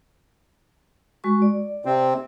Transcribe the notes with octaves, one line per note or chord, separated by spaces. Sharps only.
G#3 F#4 C#6
D5
C3 C4